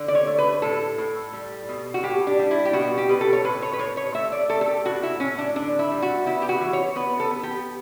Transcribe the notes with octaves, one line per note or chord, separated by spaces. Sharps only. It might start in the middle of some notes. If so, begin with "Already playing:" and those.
Already playing: D3
D5
C#5
A3
B4
A2 A4
A2
G3
B2
F#4
A2 G4
D4
G3
E4
G4
B2 F#4
G4
B2 B4
A4
C#5
A2 B4
C#5
B4
A2 C#5
C#5
A3 E5
D5
A3 A4
A4
G4
A2 F#4
E4
A2 C#4
D4
D3 D4
E4
G3
F#4
B3 E4
G4
F#4
E3
C#5
B3 B4
A4
B3
G4